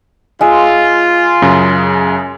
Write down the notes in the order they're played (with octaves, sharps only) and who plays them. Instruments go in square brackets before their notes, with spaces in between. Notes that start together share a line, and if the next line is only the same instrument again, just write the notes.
[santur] G#3 E6 [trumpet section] F4
[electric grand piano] F#2 C#3